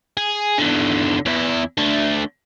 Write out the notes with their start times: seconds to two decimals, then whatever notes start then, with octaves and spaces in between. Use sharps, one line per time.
0.17 G#4
0.58 E2 D3
1.26 E2 E4
1.77 D3 A3